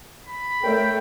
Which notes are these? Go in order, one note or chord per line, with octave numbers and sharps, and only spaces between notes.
B5
A3 A#4 C#5 E5 G5